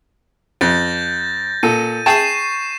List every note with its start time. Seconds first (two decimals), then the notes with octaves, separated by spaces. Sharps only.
0.61 F2 G6 A6 A#6
1.63 A#2 A4 D#7
2.06 G#4 G5 A5 C#6 C7 E7